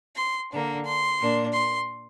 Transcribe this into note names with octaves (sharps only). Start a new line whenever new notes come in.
C6
D3 A#3 D4
C6
A#2 A#3 D4
C6